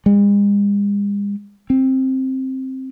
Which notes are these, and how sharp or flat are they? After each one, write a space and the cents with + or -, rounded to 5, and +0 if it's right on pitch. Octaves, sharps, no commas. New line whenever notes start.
G#3 -45
C4 +10